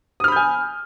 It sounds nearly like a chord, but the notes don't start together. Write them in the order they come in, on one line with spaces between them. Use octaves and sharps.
D#6 F6 B5 G6 G#5